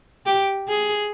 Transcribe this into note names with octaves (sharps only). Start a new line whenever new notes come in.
G4
G#4